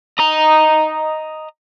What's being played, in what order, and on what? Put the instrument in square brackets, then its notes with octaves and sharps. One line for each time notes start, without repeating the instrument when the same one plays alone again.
[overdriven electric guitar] D#5 A#5